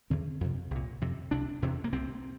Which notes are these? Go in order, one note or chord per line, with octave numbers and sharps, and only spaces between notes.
E2 D3 C4
F2 C3
C2 A#2
F2 C3
C2 C3 D4
E2 C3
A#3
C2 C3 C4